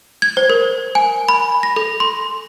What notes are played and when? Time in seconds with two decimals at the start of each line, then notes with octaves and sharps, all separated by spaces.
0.22 G#6
0.37 C5
0.50 A#4
0.95 G#5
1.29 B5
1.63 A#6
1.76 A4
2.00 C6